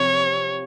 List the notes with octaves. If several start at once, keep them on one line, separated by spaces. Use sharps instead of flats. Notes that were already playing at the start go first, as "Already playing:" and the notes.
Already playing: C3 F3 C4 C#5